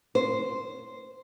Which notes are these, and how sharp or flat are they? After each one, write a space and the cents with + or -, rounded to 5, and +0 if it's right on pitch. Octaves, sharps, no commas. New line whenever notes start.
C5 -5